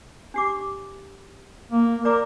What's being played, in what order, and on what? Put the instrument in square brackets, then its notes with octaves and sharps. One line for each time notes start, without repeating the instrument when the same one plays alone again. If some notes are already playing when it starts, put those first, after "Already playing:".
[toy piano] D4 G4 D6
[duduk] A#3
[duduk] A#4 [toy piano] D5 A#5 D6